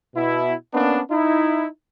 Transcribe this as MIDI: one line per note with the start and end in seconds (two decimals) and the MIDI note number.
0.16 0.54 47
0.16 0.54 64
0.74 1.00 58
0.74 1.00 59
0.74 1.00 61
0.74 1.00 62
1.10 1.66 63
1.10 1.66 64